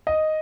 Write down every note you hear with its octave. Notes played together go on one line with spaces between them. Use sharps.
D#5